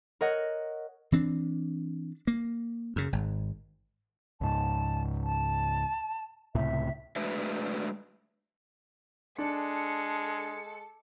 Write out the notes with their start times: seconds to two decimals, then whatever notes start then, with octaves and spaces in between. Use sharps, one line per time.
0.21 A#4 C#5 D#5 F#5
1.12 E3 C4 D4
2.27 A#3
2.96 F#2 C#3
3.12 G#1 G#2
4.41 C#2 G#2 A5
5.24 A5
6.55 C#2 A2 C3 E5
7.16 G#3 A3 D4 F#4 B4 E5
9.38 G#3 D4 A4 C#7